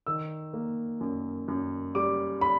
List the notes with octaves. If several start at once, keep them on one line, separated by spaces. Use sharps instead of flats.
D#3 E6
A#3
F#2
F#2
G3 D6
B5